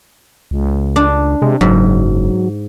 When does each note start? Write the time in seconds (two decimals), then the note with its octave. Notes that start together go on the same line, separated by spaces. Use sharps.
0.51 C#2
0.96 D4
1.42 C3 G#3
1.61 F#1 G#2 F#3